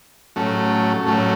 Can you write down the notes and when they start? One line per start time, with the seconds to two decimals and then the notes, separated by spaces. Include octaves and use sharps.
0.36 A2 F#3 A3 C#4
1.06 A2 F#3 A3 C#4